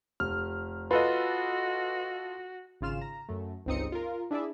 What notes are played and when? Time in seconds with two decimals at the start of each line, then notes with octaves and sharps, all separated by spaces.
0.20 F1 F6
0.91 F4 F#4 A4 B4 D#5
2.81 G#1 C#3 F4 F6 E7
3.01 A#5
3.29 F#2 A3
3.66 G1 C#2 C4 D#4 D#6 C#7
3.92 F4 A#4
4.31 D4 E4 G#4 D5 E5